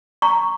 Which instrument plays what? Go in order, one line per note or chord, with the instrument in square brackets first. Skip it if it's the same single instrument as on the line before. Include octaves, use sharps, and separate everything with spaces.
[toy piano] A#5 C#6